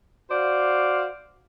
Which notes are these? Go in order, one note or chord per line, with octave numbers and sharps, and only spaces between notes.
F#4 C5 D5 F5